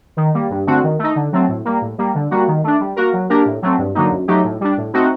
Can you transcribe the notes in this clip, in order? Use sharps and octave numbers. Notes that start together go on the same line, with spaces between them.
D#3
G3 A#3
G2
D3 A3 C4 F#4
D#3
A3 D#4
D3
F#3 A3 C4
A2
G3 A#3
A2
G3 A#3
D3
G3 A#3 F#4
D#3
A3 D4
G3
A#3 F#4 A#4
F#3
A#3 D4 G4 A#4
A2
F#3 A3 C4
G2
D3 F#3 A#3 D#4
F#2
F#3 A3 D#4 G4
A2
G3 D4
A2
A3 C4 D#4 F#4